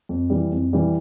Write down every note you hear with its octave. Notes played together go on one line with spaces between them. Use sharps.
F2
E3 G3
F2
E3 G3